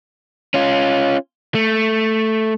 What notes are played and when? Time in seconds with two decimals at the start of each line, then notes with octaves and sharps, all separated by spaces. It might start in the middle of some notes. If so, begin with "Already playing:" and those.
0.54 C#4 F4
1.55 A3